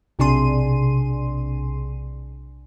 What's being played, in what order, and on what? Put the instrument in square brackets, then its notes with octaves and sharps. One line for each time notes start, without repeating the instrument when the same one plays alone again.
[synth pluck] B1 C3 D4 G#4 C6 D#7